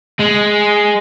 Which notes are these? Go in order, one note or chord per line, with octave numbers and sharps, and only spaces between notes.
G#3